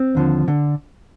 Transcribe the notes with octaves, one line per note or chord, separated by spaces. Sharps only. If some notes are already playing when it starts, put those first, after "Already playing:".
Already playing: C4
D#2 D3 F3
D3